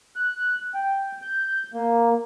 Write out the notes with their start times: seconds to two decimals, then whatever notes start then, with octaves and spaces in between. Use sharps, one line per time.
0.16 F#6
0.74 G5
1.22 G6
1.74 A#3